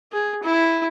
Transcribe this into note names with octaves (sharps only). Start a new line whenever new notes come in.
G#4
E4